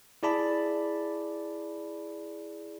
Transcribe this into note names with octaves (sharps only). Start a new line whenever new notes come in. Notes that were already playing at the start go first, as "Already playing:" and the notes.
E4 G#4 D5 A5 B5